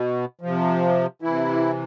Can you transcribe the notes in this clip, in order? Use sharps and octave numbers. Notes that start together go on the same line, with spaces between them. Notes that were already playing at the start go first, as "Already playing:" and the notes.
Already playing: B2
C3 F3
C3 E3 E4